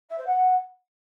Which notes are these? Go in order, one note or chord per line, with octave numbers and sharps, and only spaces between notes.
E5
C5
F#5